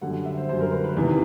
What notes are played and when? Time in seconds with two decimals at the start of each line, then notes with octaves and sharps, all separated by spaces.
0.01 F#2 D3 G3 F#5
0.25 E5
0.37 C5
0.49 F#2 D3 G3 C5
0.61 A#4
0.72 B4
0.84 B4
0.96 E2 C3 D#3 G3